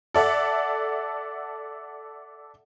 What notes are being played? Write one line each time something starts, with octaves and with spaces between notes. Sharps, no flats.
A4 D5 E5 F#5